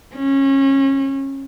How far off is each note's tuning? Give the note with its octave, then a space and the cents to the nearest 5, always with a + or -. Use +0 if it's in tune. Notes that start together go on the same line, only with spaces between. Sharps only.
C#4 -25